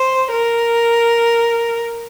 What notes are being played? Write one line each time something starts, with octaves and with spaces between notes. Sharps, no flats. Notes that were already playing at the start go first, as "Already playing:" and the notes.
Already playing: C5
A#4